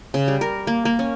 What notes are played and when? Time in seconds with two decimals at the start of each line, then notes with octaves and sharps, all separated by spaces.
0.14 C#3
0.28 G3
0.41 A#4
0.67 A#3
0.85 A#3
0.99 C#4